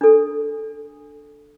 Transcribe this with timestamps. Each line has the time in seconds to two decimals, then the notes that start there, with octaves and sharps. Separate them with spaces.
0.01 D4 A4